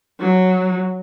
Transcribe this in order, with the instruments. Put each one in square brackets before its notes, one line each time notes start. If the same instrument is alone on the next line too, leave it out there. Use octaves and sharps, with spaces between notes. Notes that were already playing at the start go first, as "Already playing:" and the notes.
[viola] F#3